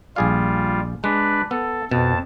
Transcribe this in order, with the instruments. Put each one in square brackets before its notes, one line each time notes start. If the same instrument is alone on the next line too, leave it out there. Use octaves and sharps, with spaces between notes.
[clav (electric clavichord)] A#1 G#4 F5 [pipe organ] G3 F4
[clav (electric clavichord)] G#3 [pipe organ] D4 B4
[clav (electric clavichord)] B3 [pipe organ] A4
[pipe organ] F2 A5 [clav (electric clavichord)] B2